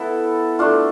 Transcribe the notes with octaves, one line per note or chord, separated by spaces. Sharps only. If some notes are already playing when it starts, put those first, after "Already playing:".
Already playing: B3 E4 A4
A3 D4 F4